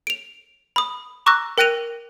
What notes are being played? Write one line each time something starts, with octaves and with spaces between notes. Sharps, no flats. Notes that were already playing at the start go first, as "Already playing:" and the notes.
D7 F7
B5 D#6
A#5 C#6 D6 E6 F#6 A#6
A#4 G5 F#6 A#6 D#7 F7